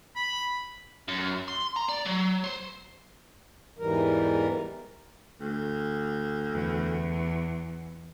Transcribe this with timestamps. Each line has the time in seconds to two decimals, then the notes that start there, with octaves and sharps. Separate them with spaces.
0.16 B5
1.08 F#2
1.48 C6
1.76 A#5
1.88 D5
2.06 F#3
2.44 C5
3.78 E2 G#2 E3 G3 A#4
5.41 D2
6.52 E2